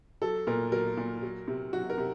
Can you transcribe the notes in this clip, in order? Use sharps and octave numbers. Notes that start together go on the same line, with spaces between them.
F#3 A4
A#2 A#4
F#3 A#4
A#2
F#3
C3
F#3 F#4
A#4
C3